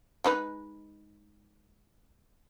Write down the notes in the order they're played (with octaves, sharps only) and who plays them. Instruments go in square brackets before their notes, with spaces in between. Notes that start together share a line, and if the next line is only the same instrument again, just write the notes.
[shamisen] G#3 D#4 B4